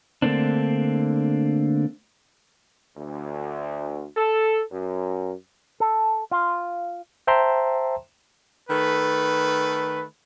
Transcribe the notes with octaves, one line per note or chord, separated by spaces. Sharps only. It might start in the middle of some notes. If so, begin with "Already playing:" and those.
D3 A3 A#3 C4 D4
D2
A4
F#2
A4
F4
C5 E5 G5 A5 A#5 C6
D#3 A3 A4 B4